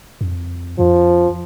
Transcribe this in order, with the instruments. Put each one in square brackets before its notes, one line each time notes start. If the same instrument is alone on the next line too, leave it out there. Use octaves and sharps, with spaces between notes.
[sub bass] F2
[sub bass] F2 [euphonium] F3